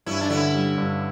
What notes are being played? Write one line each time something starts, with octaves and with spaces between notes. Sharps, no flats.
G2 C#4 E4
D4
D3 C#4 E4
G3
G2